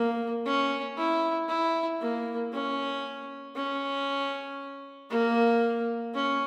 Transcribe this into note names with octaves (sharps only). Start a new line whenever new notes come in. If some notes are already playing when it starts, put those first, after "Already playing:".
Already playing: A#3
C#4
E4
E4
A#3
C#4
C#4
A#3
C#4